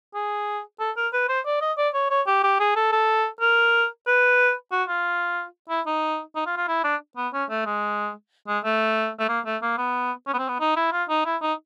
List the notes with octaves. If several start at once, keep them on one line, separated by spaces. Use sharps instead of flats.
G#4
A4
A#4
B4
C5
D5
D#5
D5
C#5
C#5
G4
G4
G#4
A4
A4
A#4
B4
F#4
F4
E4
D#4
D#4
F4
F4
E4
D4
B3
C#4
A3
G#3
G#3
A3
A3
A#3
A3
A#3
B3
C#4
B3
C4
B3
D#4
E4
F4
D#4
E4
D#4